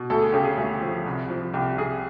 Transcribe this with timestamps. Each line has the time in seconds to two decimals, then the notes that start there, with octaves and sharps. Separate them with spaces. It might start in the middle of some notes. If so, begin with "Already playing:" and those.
Already playing: B2
0.10 D2 A4
0.21 G#4
0.33 C#3 G4
0.44 G#4
0.58 D2
0.82 F3
1.06 C2
1.30 F3
1.54 C2 G4
1.78 C2 G#4